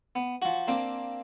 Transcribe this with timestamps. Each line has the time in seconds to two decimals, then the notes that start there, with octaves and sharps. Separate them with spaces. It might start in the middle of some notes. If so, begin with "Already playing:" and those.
0.15 B3
0.42 F3 F#4
0.68 A#3 C4 D4